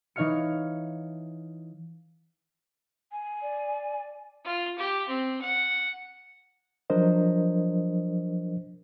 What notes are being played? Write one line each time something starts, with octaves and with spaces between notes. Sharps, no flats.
E3 D#4 C#5 F5 F6 C#7
G#5
D5
F4
G4
C4
F#5
F3 F#3 D4 A#4 C5 D#5